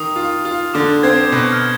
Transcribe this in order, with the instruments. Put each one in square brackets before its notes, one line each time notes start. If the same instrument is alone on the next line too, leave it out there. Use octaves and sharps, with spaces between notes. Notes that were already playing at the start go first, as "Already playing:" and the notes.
Already playing: [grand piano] D#3 [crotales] D#6
[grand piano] F4
F4
[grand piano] D3 [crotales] D6
[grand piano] C4 [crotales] G#6
[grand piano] B2 [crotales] G6
[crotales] F6